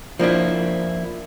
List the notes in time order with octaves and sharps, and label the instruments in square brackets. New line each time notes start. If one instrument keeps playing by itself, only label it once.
[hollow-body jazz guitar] F3 A#3 D4 E4